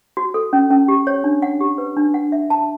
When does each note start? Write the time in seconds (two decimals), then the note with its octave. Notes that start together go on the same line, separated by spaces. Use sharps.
0.17 F#4
0.34 A4
0.53 C#4
0.71 C#4
0.88 G4
1.07 C#5
1.24 D4
1.42 F#5
1.61 G4
1.78 B4
1.97 D4
2.14 F#5
2.32 E5
2.50 A5